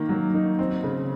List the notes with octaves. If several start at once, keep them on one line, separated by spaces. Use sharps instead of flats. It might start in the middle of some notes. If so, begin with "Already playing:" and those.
Already playing: D#3 A#3
F#3
D#4
C4
C#3